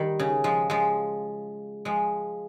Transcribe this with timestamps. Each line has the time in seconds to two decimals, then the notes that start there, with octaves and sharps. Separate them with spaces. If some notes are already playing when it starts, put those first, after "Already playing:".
Already playing: D#3 G3
0.19 C#3
0.44 F3 G#3
0.70 F3 G#3
1.85 F3 G#3